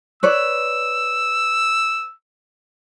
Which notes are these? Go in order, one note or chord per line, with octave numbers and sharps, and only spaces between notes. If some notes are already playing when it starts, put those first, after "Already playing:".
B4 C#5 D5 E6